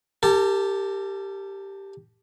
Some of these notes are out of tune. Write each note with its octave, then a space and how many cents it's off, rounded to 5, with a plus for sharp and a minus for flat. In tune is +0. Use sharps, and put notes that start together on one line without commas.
G4 +0 A#4 -45 A5 -10